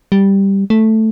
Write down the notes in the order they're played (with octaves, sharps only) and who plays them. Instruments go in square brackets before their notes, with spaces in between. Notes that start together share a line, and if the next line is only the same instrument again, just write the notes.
[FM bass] G3
A3